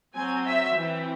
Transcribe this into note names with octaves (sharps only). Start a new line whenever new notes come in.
F#3 C4 G#5
E5
E3 C4